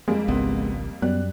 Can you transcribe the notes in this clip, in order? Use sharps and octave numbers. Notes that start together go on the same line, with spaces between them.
F2 G3 G#3 A#3
G#1 C#2 B3 C4
F#2 G3 B3 F#6